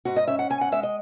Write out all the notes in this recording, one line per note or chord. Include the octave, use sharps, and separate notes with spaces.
G#2 F#4
D#5
C#4 E5
F#5
G#2 G#5
F#5
G#3 E5
D#5